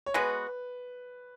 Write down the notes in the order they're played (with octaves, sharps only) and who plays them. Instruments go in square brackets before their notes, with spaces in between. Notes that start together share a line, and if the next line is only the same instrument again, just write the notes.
[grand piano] C#5
[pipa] G#3 B3 F#4 [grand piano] B4